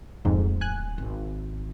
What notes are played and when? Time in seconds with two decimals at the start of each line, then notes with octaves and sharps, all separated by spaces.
0.25 D1 F2 G#2
0.61 G#5 F#6
0.98 G#1